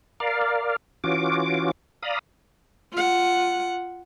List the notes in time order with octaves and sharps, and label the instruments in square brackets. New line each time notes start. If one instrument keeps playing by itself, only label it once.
[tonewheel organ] A#4 D5 F5
E3 C#4 F4 F#4 D6
D5 F5 A#5 B5 D#6
[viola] F4 F#5